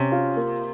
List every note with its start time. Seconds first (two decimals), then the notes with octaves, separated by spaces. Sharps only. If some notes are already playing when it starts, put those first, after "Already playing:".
Already playing: C3 C#4
0.12 F4
0.36 A#3